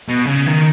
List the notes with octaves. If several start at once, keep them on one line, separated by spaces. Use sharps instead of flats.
B2
C#3
D#3